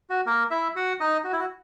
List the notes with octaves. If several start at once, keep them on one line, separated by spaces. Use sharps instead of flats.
F#4
A#3 A#4
E4 E5
F#4 F#5
D#4 D#5
F#4
E4
F#4